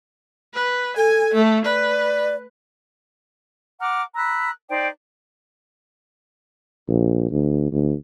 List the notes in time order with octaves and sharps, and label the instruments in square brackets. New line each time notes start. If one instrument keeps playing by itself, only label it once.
[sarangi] B4
[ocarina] A4 [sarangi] G#5
[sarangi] A3
[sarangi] B4 [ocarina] D5
[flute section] F#5 A#5 D6 F6
A#5 B5 E6 F#6
D#4 C5 D5 G5
[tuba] A#1
D2
D2